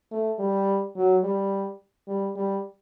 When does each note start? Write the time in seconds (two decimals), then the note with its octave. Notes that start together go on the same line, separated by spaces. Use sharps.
0.12 A3
0.39 G3
0.96 F#3
1.24 G3
2.08 G3
2.36 G3